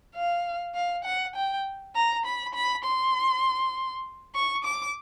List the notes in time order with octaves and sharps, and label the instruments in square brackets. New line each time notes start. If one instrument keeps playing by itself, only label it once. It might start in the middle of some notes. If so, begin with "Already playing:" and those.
[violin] F5
F5
F#5
G5
A#5
B5
B5
C6
C#6
D6